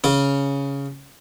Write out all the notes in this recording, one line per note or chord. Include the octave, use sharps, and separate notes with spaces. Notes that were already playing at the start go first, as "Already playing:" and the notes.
C#3 C#4